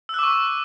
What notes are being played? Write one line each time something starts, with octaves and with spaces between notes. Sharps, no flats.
C#6 D6 E6 F#6